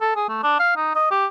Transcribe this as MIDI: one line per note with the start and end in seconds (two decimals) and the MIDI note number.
0.01 0.11 69
0.16 0.24 68
0.29 0.42 57
0.43 0.58 62
0.59 0.72 77
0.76 0.95 63
0.95 1.06 75
1.11 1.26 67